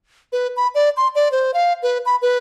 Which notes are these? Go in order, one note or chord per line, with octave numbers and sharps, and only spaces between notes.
B4
B5
D5
C6
D5
C5
F5
B4
B5
B4